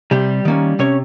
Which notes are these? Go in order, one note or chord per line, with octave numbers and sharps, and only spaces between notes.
C3 G3 G4
D#3 A#3 C#4
C3 C#4 C#5